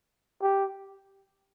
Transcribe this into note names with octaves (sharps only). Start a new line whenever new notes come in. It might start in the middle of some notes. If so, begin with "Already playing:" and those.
G4